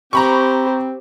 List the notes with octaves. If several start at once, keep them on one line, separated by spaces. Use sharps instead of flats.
C4 G4 C5 A#5 B5 C#6